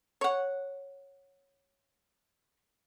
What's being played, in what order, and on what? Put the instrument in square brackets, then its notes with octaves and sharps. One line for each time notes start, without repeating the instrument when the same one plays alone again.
[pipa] C#5 F#5